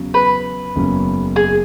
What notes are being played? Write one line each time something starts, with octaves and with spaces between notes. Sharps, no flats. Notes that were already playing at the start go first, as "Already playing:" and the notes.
Already playing: E2 C#3 F#3
B4
F#1 E2 C#3 F#3 C#4
G#4